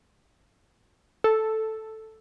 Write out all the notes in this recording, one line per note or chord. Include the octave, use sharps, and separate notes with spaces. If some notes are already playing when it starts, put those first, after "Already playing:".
A4